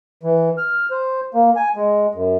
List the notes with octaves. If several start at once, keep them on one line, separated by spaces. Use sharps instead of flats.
E3
F6
C5
A#3
G#5
G#3
F#2